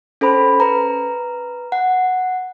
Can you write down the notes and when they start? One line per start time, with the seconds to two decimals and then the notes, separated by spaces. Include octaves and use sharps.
0.21 C#4 A4 C5 B5
0.60 B4 A#5
1.72 F#5